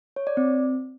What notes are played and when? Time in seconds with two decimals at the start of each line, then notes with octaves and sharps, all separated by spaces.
0.16 C#5
0.27 D5
0.37 C4